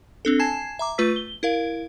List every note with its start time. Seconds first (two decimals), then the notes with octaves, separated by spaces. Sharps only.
0.25 C4 D4 A4
0.40 G#5 A5 G#6 C7 E7
0.79 E5 A#5 D6
0.98 A3 F4 B4 E6 B6
1.16 G7
1.43 E4 A#4 F5